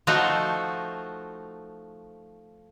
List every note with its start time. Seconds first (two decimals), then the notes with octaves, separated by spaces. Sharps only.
0.07 F3 A3 D#4 F#4 C5